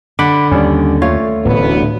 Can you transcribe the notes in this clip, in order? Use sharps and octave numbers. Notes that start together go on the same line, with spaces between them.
D3 F#5 B5 D6
D#2 G3 C#4
A3 F4 C#5
D1 A1 D2 B3